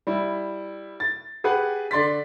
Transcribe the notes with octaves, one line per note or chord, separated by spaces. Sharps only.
G3 E4
A6
G4 G#4 B4 F#5
D3 D5 C6 A6 B6